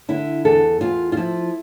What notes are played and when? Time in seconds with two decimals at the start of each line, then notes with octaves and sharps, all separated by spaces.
0.08 D3 E4
0.45 E2 A4
0.81 E2 F4
1.12 F4
1.17 F3 E4